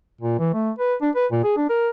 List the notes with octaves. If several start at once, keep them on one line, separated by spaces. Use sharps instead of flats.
A#2
E3
A3
B4
D4
B4
A#2
G#4
D4
A#4